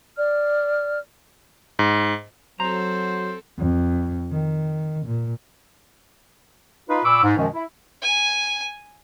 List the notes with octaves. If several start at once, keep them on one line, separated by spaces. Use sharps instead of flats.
D5 F6
G#2
F#3 C4 A4 C5 A#5
F2
D#3
A#2
D#4 F4 B4
A#2 B5 C#6 D6 E6
G#2
F#2 B2 D#3 F3 G#3 C#4
E4
G#5